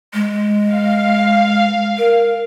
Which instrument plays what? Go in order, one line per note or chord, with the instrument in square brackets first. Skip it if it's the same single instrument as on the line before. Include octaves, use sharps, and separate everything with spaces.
[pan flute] G#3
[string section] F5
[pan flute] A#4